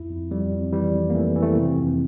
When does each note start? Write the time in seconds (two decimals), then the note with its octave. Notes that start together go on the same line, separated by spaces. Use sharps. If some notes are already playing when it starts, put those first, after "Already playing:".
Already playing: F2 E4
0.10 F2
0.31 F2 G3
0.53 F2
0.73 E3 G3
0.94 F2
1.10 A#3
1.15 E3 A3
1.35 E3
1.42 A3
1.50 A#3
1.57 C3 C4
1.78 F2